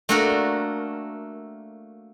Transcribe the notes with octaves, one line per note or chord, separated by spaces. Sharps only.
A3 A#3 D4 F#4 A4 A#4